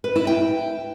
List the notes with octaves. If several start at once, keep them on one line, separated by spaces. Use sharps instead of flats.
B4
E4
G5